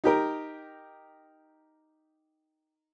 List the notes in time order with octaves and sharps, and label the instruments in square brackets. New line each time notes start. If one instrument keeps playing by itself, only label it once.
[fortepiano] D#4 G4 A#4